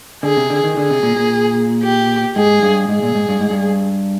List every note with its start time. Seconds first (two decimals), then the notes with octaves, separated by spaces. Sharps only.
0.23 D3 G#4
0.37 C3
0.50 D3
0.64 D#3
0.77 D3 G#4
0.91 C3
1.03 A#2
1.16 A#2
1.83 G4
2.36 G#2 G#4
2.63 G2
2.89 G#2 G#4
3.02 A#2
3.15 G#2
3.29 G2
3.41 G#2
3.50 G2